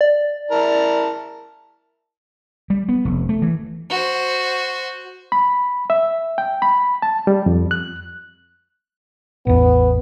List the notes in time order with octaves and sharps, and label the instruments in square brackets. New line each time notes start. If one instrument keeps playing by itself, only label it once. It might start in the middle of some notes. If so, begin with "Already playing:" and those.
[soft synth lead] D5
[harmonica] E4 A#4 A5
[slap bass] G3
B3
F1
A3
E3
[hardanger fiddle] F#4 C5
[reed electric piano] B5
E5
G5
B5
A5
G3
F2
F#6
[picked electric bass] A1 E2 [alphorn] B3